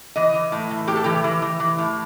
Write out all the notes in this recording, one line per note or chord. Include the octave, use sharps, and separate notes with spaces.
E3 D#5
E3
A2
E3
A2 G4
A4
E3 G4
E3
E3
E3
A2